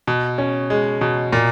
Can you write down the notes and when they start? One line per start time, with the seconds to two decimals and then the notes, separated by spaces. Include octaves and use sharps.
0.07 B2
0.38 C#4
0.70 G#3
1.01 B2
1.33 A#2